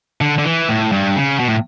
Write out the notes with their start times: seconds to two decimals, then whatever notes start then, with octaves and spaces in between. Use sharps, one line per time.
0.21 D3
0.38 D3
0.45 E3
0.69 A2
0.92 G2
1.16 C#3
1.40 B2
1.48 A2